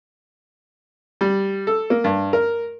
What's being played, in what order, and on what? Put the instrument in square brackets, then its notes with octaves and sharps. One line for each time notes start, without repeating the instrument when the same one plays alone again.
[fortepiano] G3
A4
A#3
G2
A#4